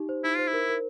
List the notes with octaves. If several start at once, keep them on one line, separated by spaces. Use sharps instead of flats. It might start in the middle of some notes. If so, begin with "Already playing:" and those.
Already playing: D#4 G4
C5
D#4 E4
F4 C5
E4
A#4
A#4